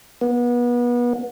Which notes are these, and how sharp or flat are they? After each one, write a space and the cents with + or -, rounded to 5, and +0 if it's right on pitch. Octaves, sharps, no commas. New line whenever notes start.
B3 -30